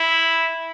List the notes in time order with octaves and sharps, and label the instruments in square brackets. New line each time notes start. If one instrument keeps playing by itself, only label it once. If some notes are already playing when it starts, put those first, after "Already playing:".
Already playing: [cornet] E4